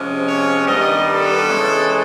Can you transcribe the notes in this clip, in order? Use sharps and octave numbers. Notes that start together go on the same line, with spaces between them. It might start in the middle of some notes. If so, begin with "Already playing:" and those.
Already playing: C3 F3 G#3 C#4
C#5
G2 D#3 G3 B3 D#5
A4
C#3 E3 G#3